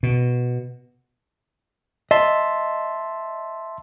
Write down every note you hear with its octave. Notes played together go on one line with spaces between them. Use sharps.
B2
D#5 E5 A5 C6